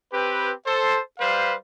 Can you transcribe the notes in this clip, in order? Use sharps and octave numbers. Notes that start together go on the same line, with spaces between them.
C4 G4 B4
A4 C5
G3 B4 C5 F5